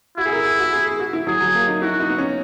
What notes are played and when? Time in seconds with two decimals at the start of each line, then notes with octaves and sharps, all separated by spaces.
0.18 E4 F#4
0.25 G#4
0.32 A#4
0.45 G#4
0.59 F#4
0.72 G#4
0.86 G#4
1.00 F#4
1.13 E4
1.27 F#3 G#4
1.41 F#3
1.55 A#3
1.68 D#4
1.81 E4 F#4
2.00 D#4
2.10 B3
2.18 C#4